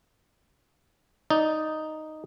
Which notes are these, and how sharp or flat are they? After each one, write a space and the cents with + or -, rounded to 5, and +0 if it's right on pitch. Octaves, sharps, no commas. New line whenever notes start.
D#4 +0 D5 +0